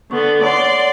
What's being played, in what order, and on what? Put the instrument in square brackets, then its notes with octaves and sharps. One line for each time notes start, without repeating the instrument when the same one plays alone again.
[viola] D3 B3 [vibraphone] C#6
[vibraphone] C#5 F#5 [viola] D5 C6